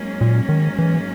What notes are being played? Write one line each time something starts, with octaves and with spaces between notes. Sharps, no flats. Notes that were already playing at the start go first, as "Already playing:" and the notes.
Already playing: G#2 F#3 A#3 C#4
A#2
D#3
E3